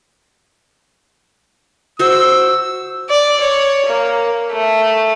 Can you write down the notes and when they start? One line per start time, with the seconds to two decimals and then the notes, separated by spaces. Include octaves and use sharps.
1.99 F#4 C5 E6
3.10 D5
3.41 C#5
3.86 A#3
4.52 A3